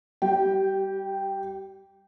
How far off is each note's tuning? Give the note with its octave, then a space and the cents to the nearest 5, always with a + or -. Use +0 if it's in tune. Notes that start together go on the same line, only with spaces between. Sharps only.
G3 +0 G4 -30 G5 +0